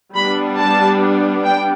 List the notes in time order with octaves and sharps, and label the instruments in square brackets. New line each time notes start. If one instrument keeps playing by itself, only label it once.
[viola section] G3 B3 D4 B5
A5
G5